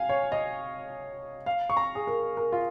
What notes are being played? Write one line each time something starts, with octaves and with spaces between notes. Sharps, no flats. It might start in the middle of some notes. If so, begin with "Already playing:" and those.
Already playing: F5 G#5
C#5
D#5
F5
C#6
A#5
G#4
A#4
A#4
F4